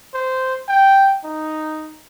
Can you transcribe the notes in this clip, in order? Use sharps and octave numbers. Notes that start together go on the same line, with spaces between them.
C5
G5
D#4